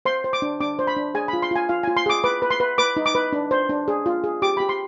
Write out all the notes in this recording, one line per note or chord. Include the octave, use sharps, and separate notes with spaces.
C5 C6
C5
D6
D4
D4 D6
C5
B5
D4
G#4 G#5
B5
F4
C6
F4 G#5
F4 F5
F4 G#5
C6
G#4 D6
B4 D6
B4
C6
B4
B4 D6
D#4
D6
B4
D4
C5
D4
G#4
F4
G#4
G4 D6
G4 B5
C6